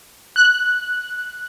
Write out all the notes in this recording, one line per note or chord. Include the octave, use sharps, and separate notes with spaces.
F#6